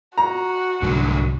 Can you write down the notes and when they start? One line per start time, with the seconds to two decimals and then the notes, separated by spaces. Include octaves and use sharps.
0.18 F#4 A#5
0.82 C2 G#2 D3 F#3